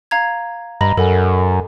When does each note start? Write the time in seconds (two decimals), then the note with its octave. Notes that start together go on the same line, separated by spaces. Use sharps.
0.11 F5 A#5 G#6
0.81 G2 D#5 A#5 B5
0.97 F#2 A4 A#4 F#5 G#5